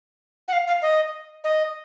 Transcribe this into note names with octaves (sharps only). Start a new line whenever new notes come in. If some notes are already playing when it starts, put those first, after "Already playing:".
F#5
F5
F5
D#5
D#5